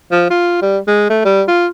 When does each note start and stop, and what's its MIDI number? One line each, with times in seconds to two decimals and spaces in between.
0.11 0.25 53
0.30 0.62 65
0.62 0.78 55
0.88 1.05 56
1.10 1.23 57
1.25 1.43 55
1.48 1.67 65